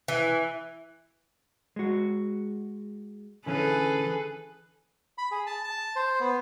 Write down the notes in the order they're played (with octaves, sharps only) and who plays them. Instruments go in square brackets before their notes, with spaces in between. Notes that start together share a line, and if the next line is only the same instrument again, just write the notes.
[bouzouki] E3
[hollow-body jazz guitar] G#3 F#4
[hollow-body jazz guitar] D3 E3 C#4 [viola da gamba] G#4 A4 B4
[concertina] B5
G#4
A5
A5
C5
B3